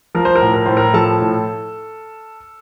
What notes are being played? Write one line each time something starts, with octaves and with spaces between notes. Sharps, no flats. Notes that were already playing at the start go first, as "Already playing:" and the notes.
F3 A#4
C5
A#4
A2
A#4
A2 C5
A#4
F3 A4 A5
A2